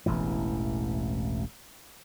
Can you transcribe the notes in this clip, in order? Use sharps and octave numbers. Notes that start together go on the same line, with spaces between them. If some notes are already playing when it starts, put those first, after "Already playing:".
E1 A1 E2 E3